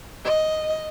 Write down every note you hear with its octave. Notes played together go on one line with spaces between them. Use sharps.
D#5